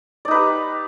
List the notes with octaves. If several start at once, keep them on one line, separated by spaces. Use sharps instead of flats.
D#4 G4 B4 D5